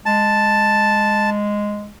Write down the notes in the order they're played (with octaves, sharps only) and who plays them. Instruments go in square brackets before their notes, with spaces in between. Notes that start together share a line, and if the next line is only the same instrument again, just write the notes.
[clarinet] G#3 [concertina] A5